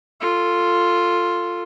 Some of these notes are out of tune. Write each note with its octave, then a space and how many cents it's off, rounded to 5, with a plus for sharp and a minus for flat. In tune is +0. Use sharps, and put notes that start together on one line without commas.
F4 +0 A4 +20